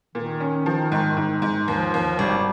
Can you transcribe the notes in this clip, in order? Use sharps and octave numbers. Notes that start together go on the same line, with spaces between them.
A#2 D#3
C#4
F3
G#2
G#2
G#2
D#2 F3
D#2
G#1 G3